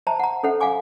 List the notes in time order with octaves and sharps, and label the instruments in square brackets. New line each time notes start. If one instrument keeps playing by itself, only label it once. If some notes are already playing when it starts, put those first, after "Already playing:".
[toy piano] C5 E5 A5 A#5
F#5 A#5
C#4 A4 C5 E5 F#5
F5 F#5 G#5 D6